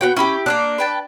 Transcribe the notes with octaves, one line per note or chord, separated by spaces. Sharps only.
B3 F#4 G5
C#4 E4 G4 B5
A#3 C4 D4 F#6
B4 G5 A5